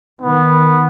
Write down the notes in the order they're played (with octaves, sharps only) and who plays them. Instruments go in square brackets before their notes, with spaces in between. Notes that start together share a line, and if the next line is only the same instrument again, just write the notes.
[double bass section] D#3 [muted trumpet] B3